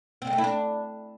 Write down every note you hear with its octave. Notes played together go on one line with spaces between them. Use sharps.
C4
G#3
A3
E4
D4